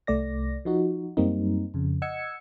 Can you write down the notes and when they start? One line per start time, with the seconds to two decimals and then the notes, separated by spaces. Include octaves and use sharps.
0.07 C2 A3 D5 A#6
0.65 F3 D#4 F#4
1.17 F#2 G3 A#3 C4 D#4
1.74 F2 C#3
2.02 D#5 F#5 E6 G#6 C#7